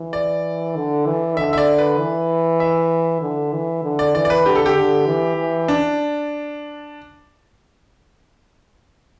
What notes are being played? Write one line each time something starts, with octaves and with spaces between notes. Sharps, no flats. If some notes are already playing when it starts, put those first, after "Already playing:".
Already playing: E3
D5
D3
E3
D3 E5
E5
D5
B4
E3
E5
D3
E3
D3
D5
E3 D5
D5
B4
D3 G4
A4
G4
D3
E3
E3
D4